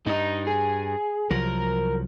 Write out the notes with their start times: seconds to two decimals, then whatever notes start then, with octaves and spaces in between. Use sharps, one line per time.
0.07 G2 D#4 D#5
0.47 G#4
1.31 C2 F3 F#3 A#4